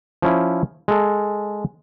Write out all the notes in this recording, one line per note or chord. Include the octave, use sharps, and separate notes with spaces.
F3 C#4 E4
G#3 A4